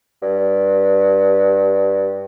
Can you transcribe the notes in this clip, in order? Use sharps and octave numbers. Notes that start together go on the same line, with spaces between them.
G2